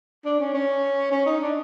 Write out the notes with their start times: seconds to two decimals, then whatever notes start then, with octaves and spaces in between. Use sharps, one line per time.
0.25 D4
0.40 C#4
0.54 C#4
1.12 C#4
1.26 D#4
1.41 D4